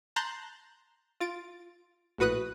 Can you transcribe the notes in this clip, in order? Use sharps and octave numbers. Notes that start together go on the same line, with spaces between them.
A5 A#5 C6 F#6 G6 A6
F4 A6 D7
A#1 A2 F#4 B4 D#6 F#6